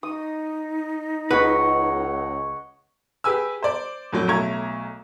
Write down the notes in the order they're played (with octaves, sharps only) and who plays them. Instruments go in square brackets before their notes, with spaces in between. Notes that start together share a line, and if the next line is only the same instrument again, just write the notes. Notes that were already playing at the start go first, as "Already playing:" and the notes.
[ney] D#4 [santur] D#6
[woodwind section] C#2 [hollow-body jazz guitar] B4 [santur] C#5 D#5 F#5
[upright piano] G4 G#4 B4 G#5 E6
C5 D5
F2 A2 F#3 A3
B1 A3 A#5 C#6 G#6